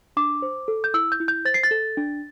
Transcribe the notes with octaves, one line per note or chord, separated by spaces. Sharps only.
D4 D6
C5
A4
G6
E4 E6
G6
E4
G6
C5 A6
C7
A6
A4
D4